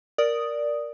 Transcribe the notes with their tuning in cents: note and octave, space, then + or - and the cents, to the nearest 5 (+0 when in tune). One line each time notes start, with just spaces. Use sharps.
A#4 +5 D5 +0 D#6 +0